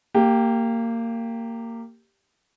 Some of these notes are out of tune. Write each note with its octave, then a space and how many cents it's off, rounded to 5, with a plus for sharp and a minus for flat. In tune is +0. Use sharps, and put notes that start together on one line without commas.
A#3 -20 G4 +0